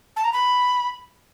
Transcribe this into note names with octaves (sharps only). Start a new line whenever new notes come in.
A5
A#5
B5